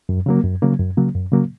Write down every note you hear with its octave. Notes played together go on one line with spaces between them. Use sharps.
F#2
C#3 F#3 A#3
F#2
C#3 F#3 A#3
F#2
C#3 F#3 A#3
F#2
C#3 F#3 A#3